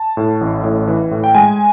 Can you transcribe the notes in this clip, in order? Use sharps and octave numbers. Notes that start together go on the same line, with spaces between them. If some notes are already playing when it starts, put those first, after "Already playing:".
Already playing: A5
A2
A1
A2
E3
A2
G5
G#3 G#5